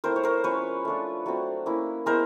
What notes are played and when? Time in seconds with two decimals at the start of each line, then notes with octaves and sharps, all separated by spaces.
0.04 A3 C4 E4 A#4 C5
0.16 C#5
0.23 A#4 C5
0.44 F3 G#3 C#4 B4 C#5
0.85 A3 D4 F4
1.26 F#3 A3 C4
1.66 A#3 C#4 E4
2.06 G#3 B3 E4 A#4 C5